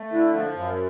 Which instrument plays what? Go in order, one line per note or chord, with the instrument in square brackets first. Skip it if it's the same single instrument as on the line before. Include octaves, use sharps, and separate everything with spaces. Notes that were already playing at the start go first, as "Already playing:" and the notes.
Already playing: [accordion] A3
[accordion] D3 [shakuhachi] E4
[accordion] F3
F#2